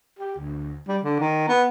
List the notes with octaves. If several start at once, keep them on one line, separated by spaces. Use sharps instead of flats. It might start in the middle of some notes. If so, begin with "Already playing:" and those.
G4
D2
G3
D3
D#3
B3